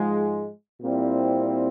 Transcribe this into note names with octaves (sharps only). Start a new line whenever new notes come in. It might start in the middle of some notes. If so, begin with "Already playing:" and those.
Already playing: G#2 F3 G#3
A#2 G3 C4 E4